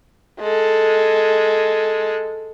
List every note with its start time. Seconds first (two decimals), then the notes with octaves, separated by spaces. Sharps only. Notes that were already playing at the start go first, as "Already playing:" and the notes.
0.40 G#3 A4